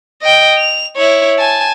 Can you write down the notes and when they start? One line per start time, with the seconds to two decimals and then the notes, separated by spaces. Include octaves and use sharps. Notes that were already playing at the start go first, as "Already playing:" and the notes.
0.22 D#5 G5
0.58 F7
0.96 E4 C#5
1.38 G#5 A5